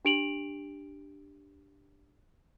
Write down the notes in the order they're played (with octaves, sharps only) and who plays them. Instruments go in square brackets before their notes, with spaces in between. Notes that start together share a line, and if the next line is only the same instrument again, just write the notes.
[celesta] D4 G4 D7 F7 F#7